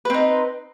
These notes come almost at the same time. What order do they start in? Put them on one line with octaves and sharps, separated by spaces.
B4 C4 D#4